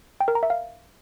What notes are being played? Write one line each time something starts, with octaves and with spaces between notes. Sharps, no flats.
G5
A#4
A#5
E5
F5